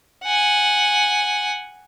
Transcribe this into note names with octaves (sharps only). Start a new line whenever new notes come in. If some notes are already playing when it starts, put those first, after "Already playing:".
F#5 G#5